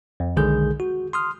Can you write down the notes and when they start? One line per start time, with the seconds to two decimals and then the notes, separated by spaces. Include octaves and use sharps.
0.20 F2
0.36 B1 D3 D#3 G#3 G#4 G6
0.80 F#4
1.13 C6 D#6 F6